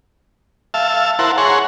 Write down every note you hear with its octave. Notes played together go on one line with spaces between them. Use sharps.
E5 F5 A5
E4 A#4 C5 F#5 A5
G#4 C#5 F#5 A#5 C6